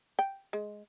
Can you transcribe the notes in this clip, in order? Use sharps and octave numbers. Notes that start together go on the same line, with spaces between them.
G5
G#3